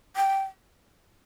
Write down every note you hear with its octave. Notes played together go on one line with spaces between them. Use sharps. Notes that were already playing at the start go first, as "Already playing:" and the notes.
G5